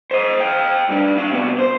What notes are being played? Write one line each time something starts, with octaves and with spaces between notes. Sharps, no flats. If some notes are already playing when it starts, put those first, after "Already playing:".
C5 D#5
F5 G5
G2 D4
D4 F5
C3 B3
C5